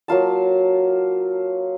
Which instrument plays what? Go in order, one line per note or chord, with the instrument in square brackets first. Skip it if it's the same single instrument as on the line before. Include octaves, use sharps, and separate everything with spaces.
[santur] F#3 A#3 F4 A5